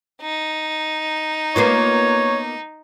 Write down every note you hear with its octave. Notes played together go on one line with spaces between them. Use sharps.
D#4
A#3 B3 F4 C#5